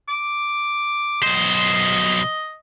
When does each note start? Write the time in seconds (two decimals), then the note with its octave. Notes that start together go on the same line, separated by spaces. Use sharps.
0.08 D6
1.23 B1 C5 D#5